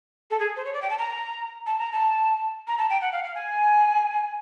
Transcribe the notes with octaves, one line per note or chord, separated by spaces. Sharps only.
A4
G#4
C5
C#5
D5
G5
A5
A#5
A5
A#5
A5
A#5
A5
G5
F#5
F5
F5
G#5